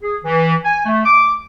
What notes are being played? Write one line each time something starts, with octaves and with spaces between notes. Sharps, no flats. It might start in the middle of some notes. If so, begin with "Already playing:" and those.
G#4
E3
G#5
A3
D6